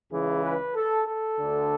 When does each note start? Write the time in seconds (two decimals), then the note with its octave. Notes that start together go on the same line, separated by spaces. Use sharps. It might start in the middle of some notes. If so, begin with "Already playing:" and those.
0.11 C#2 C#3 E3 G#4
0.43 B4
0.76 A4
1.08 A4
1.40 D2 D3